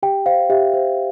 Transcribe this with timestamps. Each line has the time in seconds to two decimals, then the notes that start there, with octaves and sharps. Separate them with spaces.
0.03 G4 G5
0.26 C5 F5
0.50 G4 E5
0.74 C5